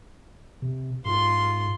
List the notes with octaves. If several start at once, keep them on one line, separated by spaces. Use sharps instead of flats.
C3
G#2 F4 C6